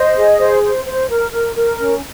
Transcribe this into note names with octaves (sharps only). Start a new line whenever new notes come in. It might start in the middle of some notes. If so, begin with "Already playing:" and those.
Already playing: C5 D#5
G#4
C5
C5
C5
A#4
A#4
A#4
C#4